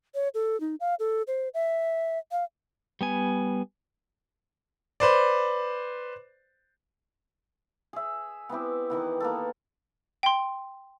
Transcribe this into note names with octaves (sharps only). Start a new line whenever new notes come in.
C#5
A4
D#4
F5
A4
C5
E5
F5
G3 B3 G#5
B4 C5 D5
G#4 E5
B3 C4 E4 G4
D#3 E3 B3
A#3 B3 A4
G5 C6